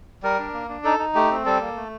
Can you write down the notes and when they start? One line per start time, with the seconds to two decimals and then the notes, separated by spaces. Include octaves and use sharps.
0.23 G3 A#4
0.39 D4
0.53 A#3
0.69 D4
0.84 D#4 A4
0.99 D#4
1.15 A3 G4
1.31 C4
1.45 G3 A4
1.60 A#3
1.76 A3